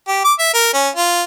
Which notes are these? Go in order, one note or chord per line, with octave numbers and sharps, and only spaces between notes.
G4
D6
E5
A#4
C#4
F4